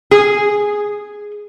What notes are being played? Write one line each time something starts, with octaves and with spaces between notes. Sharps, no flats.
G#4